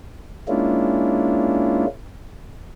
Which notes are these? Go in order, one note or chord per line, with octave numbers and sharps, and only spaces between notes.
G#3 A#3 C#4 D4 E4 F4